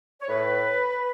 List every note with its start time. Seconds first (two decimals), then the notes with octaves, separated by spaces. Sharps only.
0.21 C#5
0.29 A2 B4